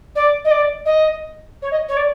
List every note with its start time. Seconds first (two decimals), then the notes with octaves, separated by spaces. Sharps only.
0.15 D5
0.44 D#5
0.50 D5
0.85 D#5
1.62 C#5
1.71 D#5
1.88 C#5
1.96 D5